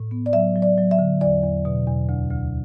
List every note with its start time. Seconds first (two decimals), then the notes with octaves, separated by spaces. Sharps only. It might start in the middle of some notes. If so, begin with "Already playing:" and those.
Already playing: A2
0.11 B3
0.26 D5
0.33 F#3 E5
0.56 F#3
0.62 D5
0.78 F#3
0.91 E5
0.99 D3
1.21 E2 D5
1.43 E2
1.65 B2
1.87 E2
2.09 D2
2.30 D2